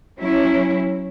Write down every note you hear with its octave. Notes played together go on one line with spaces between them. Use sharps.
F#3 C#4 E4